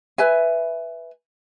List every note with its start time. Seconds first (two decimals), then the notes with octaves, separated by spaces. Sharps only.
0.18 B4 E5 G#5